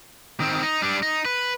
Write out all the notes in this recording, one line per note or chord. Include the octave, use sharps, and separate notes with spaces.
D#3 C4
D#4
G3 D4
D#4
B4